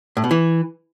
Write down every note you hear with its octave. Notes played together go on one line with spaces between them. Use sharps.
A2
B2
E3